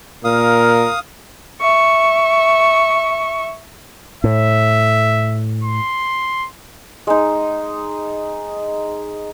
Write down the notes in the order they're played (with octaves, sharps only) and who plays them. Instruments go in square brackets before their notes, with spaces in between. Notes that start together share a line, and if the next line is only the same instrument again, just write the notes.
[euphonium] A#2 [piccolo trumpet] A#4 [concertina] F5 D#6
[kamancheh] E5 C#6
[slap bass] A2 [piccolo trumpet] E5
[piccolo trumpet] C6
[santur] G#3 D#4